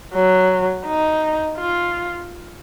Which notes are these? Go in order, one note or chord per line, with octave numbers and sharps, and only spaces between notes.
F#3
D#4
F4